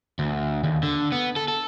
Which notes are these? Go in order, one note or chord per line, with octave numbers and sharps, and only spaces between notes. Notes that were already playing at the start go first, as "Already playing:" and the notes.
D2
D#2
D3
B3
A4
A4